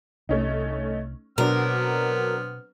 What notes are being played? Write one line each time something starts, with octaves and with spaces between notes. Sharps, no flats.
C2 A3 C#4 D#4
B2 F#3 B3 C4 D4 A#4 F6